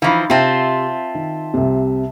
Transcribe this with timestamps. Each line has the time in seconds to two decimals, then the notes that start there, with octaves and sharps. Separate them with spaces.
0.02 E3 F3 D#4 F5
0.30 C3 C4 F4 E5 A5
1.15 D#3
1.54 C2 C3